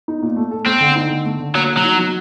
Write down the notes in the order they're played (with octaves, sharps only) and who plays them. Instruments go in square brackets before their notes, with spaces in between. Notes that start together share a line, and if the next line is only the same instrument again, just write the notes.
[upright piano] D#4
A#2
A3
A4
[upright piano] A3 [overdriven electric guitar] C4
[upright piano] D3
D#4
D3
A3
D3
[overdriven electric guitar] F#3 [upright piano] A#3
[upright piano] F#4
[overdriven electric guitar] F#3
[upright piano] D#4
F#3